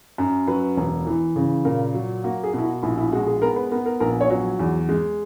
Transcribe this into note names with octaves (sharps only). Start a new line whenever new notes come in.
F#2
F#3 B4
E1
E3
C#3
A#2 A#4
F#3
A#3 F#4
G#4
B2 E4
F#4
A#1 E4
E4
G#3 F#4
G#4
B3 A#4
B4
B3 A#4
A#4
A#1 A#4
C#5
F#3
E2
G#3